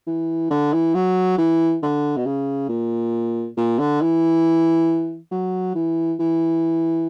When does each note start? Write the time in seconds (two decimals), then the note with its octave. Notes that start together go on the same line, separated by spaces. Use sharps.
0.07 E3
0.50 D3
0.73 E3
0.94 F#3
1.38 E3
1.82 D3
2.17 B2
2.26 C#3
2.69 A#2
3.57 A#2
3.79 D3
4.01 E3
5.31 F#3
5.75 E3
6.19 E3